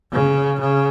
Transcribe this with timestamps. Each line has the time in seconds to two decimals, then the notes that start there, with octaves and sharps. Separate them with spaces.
0.13 C#3
0.60 C#3